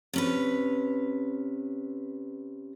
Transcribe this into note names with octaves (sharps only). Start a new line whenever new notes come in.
C3 C#4 B4